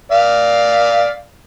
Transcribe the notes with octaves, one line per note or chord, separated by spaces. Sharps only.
D5 F5